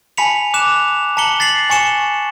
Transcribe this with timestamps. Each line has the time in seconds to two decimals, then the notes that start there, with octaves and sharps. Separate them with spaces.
0.17 G#5 A5 B5 B6 C#7 F7
0.54 D6 F#6 E7 F7
1.17 A5 A#5 B6 C#7 F#7 G7
1.40 A6 B6 C7 F#7
1.70 G#5 C#6 C#7 E7 G7